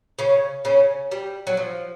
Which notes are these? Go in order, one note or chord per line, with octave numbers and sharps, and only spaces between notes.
C#3 C#4
C#3 C#4
G3
F#3
F3